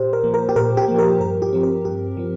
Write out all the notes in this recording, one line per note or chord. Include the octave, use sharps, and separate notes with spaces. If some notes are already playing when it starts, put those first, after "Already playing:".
Already playing: A#2 G4 C5
A#4
F3 A#3
A#4
G4
A#2 A#4
G4
F3 A#3
A#4
G2 A#4
G4
F3 C4
A#4
G2 G4
F3 C4